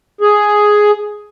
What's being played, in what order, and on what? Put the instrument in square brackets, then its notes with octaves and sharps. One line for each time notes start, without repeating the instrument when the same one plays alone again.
[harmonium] G#4